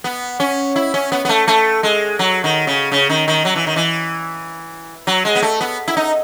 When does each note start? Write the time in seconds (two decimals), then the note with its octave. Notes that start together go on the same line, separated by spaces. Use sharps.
0.04 B3
0.40 C#4
0.76 E4
0.94 C#4
1.12 B3
1.25 B3
1.29 A3
1.48 A3
1.83 G#3
2.19 F#3
2.44 D#3
2.67 C#3
2.92 C#3
3.10 D#3
3.28 D#3
3.45 F#3
3.56 E3
3.67 D#3
3.76 E3
5.07 F#3
5.25 G#3
5.35 B3
5.42 A3
5.61 B3
5.88 E4
5.97 D#4